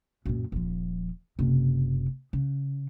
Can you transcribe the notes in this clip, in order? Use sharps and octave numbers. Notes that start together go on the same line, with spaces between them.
F#2 A#2
D#1 F3
F#1 C3
C#3